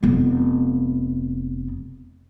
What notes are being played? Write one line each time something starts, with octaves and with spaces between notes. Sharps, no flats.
F1 B3